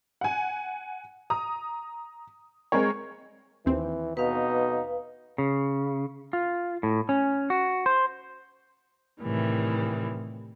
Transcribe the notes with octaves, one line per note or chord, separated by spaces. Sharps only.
F#5 G#5
A#5 D#6
G#3 C4 A#4 C#5
D#2 E3 C4
B2 D#4 B4 F5
C#3
F4
A2
C#4
F#4
C5
A2 C3 D#3 E3 G3